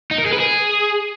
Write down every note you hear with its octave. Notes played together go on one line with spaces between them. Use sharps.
D#4
A#4
G#4
B4
G#4